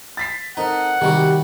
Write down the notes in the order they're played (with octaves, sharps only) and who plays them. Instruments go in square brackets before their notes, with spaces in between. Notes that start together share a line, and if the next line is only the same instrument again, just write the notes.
[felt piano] A6 B6 C7
[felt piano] C4 A4 A#4 [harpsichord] D#4 [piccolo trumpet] F#5
[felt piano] C3 [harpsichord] D#3 G3 F#4 [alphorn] G4